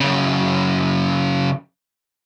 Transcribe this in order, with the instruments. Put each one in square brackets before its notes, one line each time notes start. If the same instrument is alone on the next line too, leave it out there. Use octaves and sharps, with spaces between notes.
[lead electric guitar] F#2 C#3